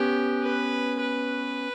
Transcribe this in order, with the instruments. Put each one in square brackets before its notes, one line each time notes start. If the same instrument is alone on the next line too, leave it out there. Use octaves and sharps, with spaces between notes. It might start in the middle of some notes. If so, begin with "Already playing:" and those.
Already playing: [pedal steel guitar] B3 C#4 [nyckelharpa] G4
[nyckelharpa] B4
B4